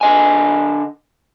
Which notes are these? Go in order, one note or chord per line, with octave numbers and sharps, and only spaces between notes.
D3 D#5 G#5